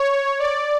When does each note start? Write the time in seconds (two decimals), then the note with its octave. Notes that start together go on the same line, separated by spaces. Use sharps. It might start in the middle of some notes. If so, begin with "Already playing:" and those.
Already playing: C#5
0.39 D5